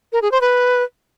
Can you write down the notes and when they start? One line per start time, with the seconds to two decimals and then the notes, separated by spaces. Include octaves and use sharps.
0.13 A#4
0.22 G#4
0.32 C5
0.41 B4